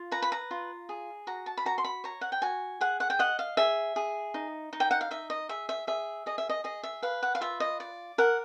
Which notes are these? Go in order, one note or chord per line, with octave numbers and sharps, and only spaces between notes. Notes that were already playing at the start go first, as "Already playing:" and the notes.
Already playing: F4
B4 A#5
B5
A#5
F4
G#4
F#4 A#5
A5
B5
F#4 A#5
C6
B5
C#5 A#5
F#5
G5
F#4 G#5
G#4 F#5
F#5
G5
D#5 F#5
F5
G#4 E5
G#4
D#4
D#4
G5
F#5
F5
D#4 E5
D#5
G#4 E5
E5
G#4 E5
G#4 D#5
E5
D#5
G#4 D#5
E5
B4 F5
F#5
F5
F4 E5
D#5
D5
A#4 F#5